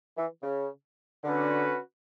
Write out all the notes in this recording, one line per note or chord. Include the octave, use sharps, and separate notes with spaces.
E3
C#3
D3 C#4 F#4 B4